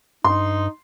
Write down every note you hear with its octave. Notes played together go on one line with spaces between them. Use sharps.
G2 D#4 C6